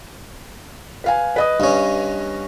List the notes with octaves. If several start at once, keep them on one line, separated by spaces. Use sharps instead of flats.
B4 F5 G#5
B4 D#5 D#6
G2 C#4